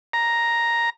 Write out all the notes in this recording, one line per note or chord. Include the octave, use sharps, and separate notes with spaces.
A#5